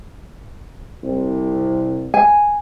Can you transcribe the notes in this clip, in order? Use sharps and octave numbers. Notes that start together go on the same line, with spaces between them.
C2
G#5